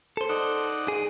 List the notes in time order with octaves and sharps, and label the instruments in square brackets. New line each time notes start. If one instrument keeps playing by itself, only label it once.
[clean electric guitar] A4 C5
[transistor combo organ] D#4 D5 F#5
[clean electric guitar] G#4